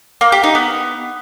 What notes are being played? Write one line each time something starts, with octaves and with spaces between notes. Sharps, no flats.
A#3
G4
D#4
B3